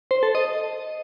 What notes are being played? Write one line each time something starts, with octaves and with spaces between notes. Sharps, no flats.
C5
A4
D#5